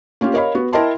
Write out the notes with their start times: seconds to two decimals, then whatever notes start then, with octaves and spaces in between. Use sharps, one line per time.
0.21 A#3 C#4 F4 G4
0.34 A#4 C#5 D#5 F5 B5
0.55 B3 F#4
0.73 E4 A#4 D#5 G5 A5 C6